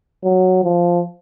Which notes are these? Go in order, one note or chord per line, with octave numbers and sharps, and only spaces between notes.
F#3
F3